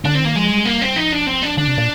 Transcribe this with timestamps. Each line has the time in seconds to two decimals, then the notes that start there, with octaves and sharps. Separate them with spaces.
0.05 D3 D4
0.15 C4
0.20 D#3 A#3
0.36 F3 G#3
0.50 G3
0.65 A#3
0.81 C4
0.96 F3 D#4
1.12 D4
1.27 C4
1.42 D4
1.57 D3 D4
1.68 C3
1.78 A#2